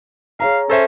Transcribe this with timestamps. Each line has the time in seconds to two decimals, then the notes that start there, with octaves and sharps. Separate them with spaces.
0.40 G#4 C#5 F5 A#5
0.70 C#4 A4 C5 E5